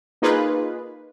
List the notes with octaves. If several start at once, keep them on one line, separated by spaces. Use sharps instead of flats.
A#3 D#4 F4 G#4 B4